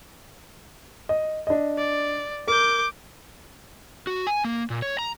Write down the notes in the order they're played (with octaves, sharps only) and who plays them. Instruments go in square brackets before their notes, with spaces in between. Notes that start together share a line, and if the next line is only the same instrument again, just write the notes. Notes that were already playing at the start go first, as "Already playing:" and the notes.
[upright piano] D#5
D4 D#5
[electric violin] D5
[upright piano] A#4 [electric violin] D6 G6
[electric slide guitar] F#4
G#5
A#3
A#2
C#5
A#5